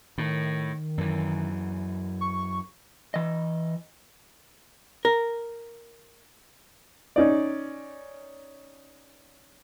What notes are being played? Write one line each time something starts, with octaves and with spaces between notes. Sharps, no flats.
A2 D#3
F#2 E3
C#6
E3 D#5
A#4
C#4 D#4 D5